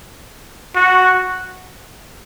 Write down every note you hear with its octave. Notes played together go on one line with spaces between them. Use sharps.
F#4